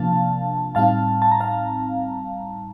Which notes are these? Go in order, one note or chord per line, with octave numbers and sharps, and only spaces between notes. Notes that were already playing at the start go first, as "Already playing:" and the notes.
Already playing: C3 F3 A#3 D4 F5 A5
A2 G3 C4 D#4 F5 A5
A5
A#5
F5 A5